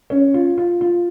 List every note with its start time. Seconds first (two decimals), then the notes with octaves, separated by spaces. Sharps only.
0.10 C#4
0.34 F4
0.58 F4
0.81 F4